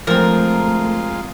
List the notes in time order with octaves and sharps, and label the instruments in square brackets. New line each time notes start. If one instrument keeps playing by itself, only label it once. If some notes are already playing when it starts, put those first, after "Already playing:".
[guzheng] F3 C4 [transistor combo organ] G#3 F4 [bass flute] A3 [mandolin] A#4